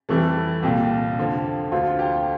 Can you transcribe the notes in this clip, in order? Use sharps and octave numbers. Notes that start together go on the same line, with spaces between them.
F2 E3 G3 A3
C2 A#2 G3 G4
F2 D3 F3
D2 D3 F3 F4
G4